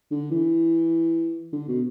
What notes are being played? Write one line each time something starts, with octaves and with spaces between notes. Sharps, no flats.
D3
E3
D3
B2